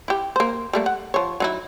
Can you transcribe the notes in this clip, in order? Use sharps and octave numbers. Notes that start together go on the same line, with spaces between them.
E4 G4
A#3 C5
G3 A3 A#3
F#5
F3 C#5
F#3 D#4 E4